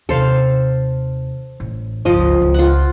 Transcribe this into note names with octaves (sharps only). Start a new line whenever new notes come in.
D#2 C3 A4 C5 F5
A1
G1 C#2 F3 D#5
C#2
F4 F#5